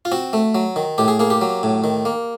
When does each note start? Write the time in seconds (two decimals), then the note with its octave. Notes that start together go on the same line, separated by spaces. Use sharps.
0.05 F4
0.12 C4 F#4
0.33 A3
0.55 F#3
0.76 D#3
0.98 A2 G4
1.08 G#4
1.19 A#3 G#4
1.30 G4
1.41 F#3
1.63 A2
1.84 D#3
2.05 A#3